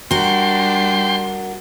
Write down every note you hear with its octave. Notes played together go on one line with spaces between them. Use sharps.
G3 D4 F#4 A#4 G5 C6